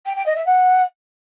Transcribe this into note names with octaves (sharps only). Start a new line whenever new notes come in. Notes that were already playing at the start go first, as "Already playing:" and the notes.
G5
G5
D#5
E5
F#5